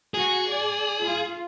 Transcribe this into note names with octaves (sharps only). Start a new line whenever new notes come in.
F#4 G#4
D5
F4